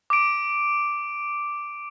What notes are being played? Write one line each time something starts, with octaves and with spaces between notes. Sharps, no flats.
D6 D7